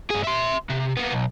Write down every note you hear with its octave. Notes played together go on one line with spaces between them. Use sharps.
G2 G#4
E5 C6
C3
A#3 B3
B1